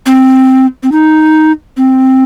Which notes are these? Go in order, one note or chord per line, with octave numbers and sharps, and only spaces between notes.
C4
C4
D#4
C4